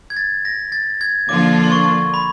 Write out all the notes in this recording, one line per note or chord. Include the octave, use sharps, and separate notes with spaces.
G#6
A6
A#6
A6
G#6
D3 F3 A#3 D4 F4 D6
C6
C#6
B5